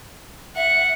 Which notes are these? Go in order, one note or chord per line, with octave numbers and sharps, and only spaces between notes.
E5 F#5